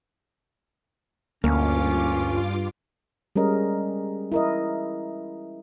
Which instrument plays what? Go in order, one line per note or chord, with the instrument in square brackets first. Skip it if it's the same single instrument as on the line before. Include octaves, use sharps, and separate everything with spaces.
[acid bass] D2 [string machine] G2 F4 D6 [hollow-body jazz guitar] A#3 [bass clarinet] C#4
[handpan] G3 G#3 C#4 A#4 D#5
E4 A#4 D#5